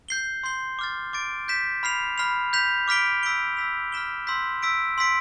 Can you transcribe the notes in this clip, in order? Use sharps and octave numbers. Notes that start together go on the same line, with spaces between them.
G6 C7 G7
C6 G6 C7 G7
D6 F6 A6
D6 A6 D7
G6 B6 E7
B5 F6 C7 F7
B5 F6 C7 F7
G6 B6 F7
D6 F6 B6 D7 G7
E6 B6 D7 G7
E6 B6 F7
F6 B6 E7 G7
C6 E6 G6 B6
E6 B6 D7
C6 E6 B6 D7